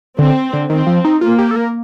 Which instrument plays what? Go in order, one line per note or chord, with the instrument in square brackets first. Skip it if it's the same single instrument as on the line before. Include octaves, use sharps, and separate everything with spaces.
[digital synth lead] D3 [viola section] C4
[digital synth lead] D3
[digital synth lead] D#3 [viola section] C4
[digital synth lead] F3
D#4
[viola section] A#3 [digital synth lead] F4
[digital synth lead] G4
A4
A#4